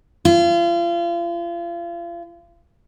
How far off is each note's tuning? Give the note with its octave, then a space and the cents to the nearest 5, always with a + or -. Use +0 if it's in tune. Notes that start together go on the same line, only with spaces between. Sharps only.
F4 -35